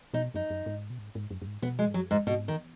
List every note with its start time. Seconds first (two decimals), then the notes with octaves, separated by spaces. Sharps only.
0.14 B2 D#4
0.34 F#2 D#4
0.50 F#2
0.66 G#2
0.90 B2
0.99 G#2
1.15 G#2
1.31 F#2
1.42 F#2
1.47 G#2
1.62 B2 B3
1.79 G#3
1.88 G#2
1.94 F#2 F#3
2.11 G#2
2.27 G#2 B2
2.48 D#3